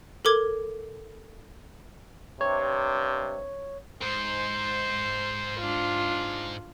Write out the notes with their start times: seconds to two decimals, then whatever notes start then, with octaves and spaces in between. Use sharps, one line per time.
0.25 A4 A#4 D6 G#6
2.41 G2 C3 C#5
4.02 G#2 C5
5.60 D4 F4